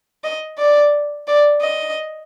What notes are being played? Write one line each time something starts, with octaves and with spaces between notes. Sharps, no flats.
D#5
D5
D5
D#5